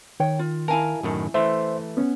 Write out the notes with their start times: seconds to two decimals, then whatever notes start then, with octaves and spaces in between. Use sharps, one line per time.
0.20 D#3 C#5 G5
0.39 F4
0.68 E4 A#4 F5 G#5 A5
1.03 F#2 A2 D#3
1.34 E3 A3 C5 E5 C6
1.97 B3 C#4